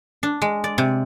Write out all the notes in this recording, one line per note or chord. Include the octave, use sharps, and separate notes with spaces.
D4
G#3
D5
C3